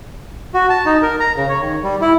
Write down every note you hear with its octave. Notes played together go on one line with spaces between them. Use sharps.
F#4
A5
D#4
A#4
A#5
C#3
C#5
D#3
G3
E4